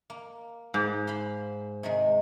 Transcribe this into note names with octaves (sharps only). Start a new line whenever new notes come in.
A#3
G#2
C5 F5 B5
C3 D#3 G#3